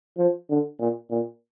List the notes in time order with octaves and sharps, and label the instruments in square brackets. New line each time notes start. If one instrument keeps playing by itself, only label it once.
[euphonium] F3
D3
A#2
A#2